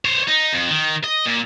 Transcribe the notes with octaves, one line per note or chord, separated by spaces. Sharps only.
C5 C#5
D#4
F2
D#3
D#5
A#2